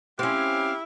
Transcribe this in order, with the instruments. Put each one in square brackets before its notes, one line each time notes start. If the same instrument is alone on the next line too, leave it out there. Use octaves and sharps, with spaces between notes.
[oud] C4 C#4 [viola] E4 [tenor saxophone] G4 [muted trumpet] F5